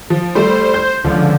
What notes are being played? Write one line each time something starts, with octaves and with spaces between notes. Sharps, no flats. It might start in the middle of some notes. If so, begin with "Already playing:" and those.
F3
G3 A3 C5
G6
C#2 D3 F3